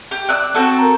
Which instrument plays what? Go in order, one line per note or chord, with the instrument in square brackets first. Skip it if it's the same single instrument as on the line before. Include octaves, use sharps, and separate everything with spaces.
[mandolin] G4
D5 E6 F#6
C4 F#4 A4
[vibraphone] A#4 A#5